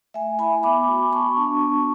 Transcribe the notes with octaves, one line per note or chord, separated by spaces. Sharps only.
A3 E5 G#5
E4 G#5 B5
B3 B5 D6
F#4
B3 A5 C#6
D4 F#4
B3